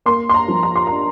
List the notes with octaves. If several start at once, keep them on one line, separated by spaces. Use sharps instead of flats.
A#3 C6
C6
A#5
F3
A#5
C6
D4 A#5